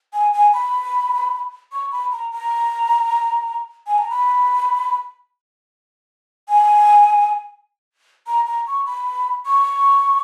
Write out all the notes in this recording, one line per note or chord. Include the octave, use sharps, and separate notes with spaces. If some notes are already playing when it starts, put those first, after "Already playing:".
G#5
G#5
B5
C#6
B5
A#5
A#5
G#5
A#5
B5
G#5
A#5
A#5
C#6
B5
C#6